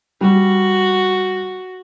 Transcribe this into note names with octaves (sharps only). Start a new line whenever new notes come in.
G3 F#4